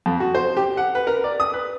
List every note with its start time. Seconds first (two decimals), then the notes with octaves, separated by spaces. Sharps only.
0.06 F2
0.20 F#4
0.35 C5
0.57 G4
0.77 F#5
0.95 B4
1.07 A#4
1.24 D5
1.40 D#6
1.54 B4